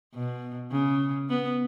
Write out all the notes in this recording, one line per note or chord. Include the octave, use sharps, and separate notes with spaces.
B2
C#3
B3